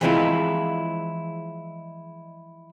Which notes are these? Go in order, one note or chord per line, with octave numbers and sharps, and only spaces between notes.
E3 F3 G#3 C4 E4 F4